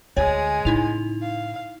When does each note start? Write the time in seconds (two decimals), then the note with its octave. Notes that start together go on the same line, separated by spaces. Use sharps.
0.17 D2 G#3 C#5 G#5
0.65 A2 C#3 D#4 E4 F7
1.22 F5